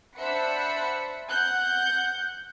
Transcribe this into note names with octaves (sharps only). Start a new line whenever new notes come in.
D4 C5 E5 F#5 B5 C#7
F#5 F#6 G6